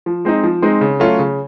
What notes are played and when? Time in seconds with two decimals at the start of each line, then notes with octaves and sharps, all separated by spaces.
0.06 F3
0.25 G#3 C4 D#4
0.43 F3
0.62 G#3 C4 D#4
0.81 C#3
1.00 F#3 A3 C#4 F4
1.19 C#3